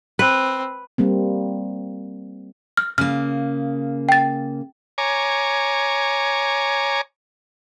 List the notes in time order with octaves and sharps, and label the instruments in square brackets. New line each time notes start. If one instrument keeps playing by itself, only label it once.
[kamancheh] C4 [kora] B4
[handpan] G3 A#3 C4
[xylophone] F6
[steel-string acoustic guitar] C#3 A#3 [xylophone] F6
[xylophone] G5 A6
[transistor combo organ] C#5 G#5 A#5 D6